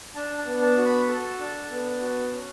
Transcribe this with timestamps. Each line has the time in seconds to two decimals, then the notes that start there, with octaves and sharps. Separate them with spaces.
0.15 D4 A5
0.39 A5
0.46 B3
0.62 A5
0.77 F#4
0.85 B5
1.08 A4 A5
1.39 D4
1.70 B3
2.01 F#4
2.32 C#4